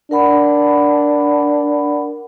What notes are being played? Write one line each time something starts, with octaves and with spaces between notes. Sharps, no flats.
D4 A#4 F#5 B5